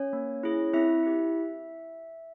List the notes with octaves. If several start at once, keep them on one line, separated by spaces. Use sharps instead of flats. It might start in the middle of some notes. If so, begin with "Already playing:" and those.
Already playing: C#4 C#5
A#3
E4 G#4
C4 E4 E5
E4 G4